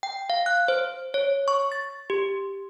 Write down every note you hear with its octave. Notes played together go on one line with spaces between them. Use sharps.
G5
F5
F#6
C5
C#5
C#6
A6
G4